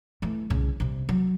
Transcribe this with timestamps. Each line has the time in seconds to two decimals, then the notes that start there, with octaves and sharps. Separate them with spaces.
0.22 E3 A3
0.50 C2 C#3
0.80 C3 G3
1.09 F#3